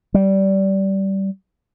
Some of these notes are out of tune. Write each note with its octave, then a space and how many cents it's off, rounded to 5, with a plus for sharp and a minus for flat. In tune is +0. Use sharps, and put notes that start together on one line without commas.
G3 -20